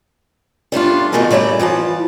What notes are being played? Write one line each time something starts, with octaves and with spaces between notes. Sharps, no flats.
G3 A3 D4 F4
F2 B2 D#3 A3 G#4 A#4
G3 A3 C#5 D5 A#5
E3 F3 F#5 A5